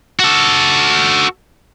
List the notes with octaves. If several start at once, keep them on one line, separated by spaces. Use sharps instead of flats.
F#4 A4